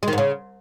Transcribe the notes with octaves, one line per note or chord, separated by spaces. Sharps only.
G#3
D#3
G#2
C#3